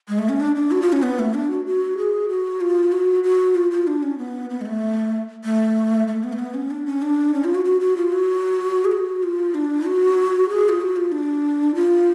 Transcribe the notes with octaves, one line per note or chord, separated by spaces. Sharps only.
G#3
A3
C#4
D4
D4
F#4
F4
C#4
B3
A3
D4
F#4
F#4
G#4
F#4
F4
F#4
F#4
F4
F4
D4
C#4
B3
B3
G#3
A3
A3
A3
B3
A3
B3
C#4
D4
C#4
D4
C#4
F4
F#4
F#4
F#4
F4
F#4
G#4
F#4
F4
D4
F#4
G#4
F4
F#4
F4
D4
F4